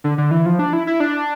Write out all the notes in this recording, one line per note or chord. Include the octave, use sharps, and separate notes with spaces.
D3
D3
E3
F3
D4
E4
E4
D4